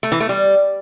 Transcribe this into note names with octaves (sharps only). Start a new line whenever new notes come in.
A3
E3
A3
G3